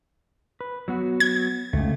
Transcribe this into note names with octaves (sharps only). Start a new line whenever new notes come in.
B4
F#3 B3 F#4
G#6
C#2 A3